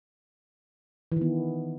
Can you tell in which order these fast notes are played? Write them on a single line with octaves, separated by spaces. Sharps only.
E3 D#3 B3